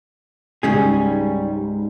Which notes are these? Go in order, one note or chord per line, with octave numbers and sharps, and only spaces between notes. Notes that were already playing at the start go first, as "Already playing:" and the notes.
C#2 G#2 G3 C#4 G#4